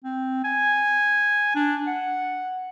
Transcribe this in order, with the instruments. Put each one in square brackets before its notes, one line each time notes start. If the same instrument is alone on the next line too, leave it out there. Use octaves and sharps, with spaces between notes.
[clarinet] C4
G#5
D4
F#5